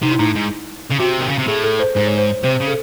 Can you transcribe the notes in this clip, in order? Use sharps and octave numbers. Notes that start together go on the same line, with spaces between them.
C3 D#4
E4
A2 D#4
G#2
C#3
C3 F#4
D#3
C#3
C3
A2 G#4
A4
C5
G#2 C5
C#5
C5
C3 C5
C#3
A4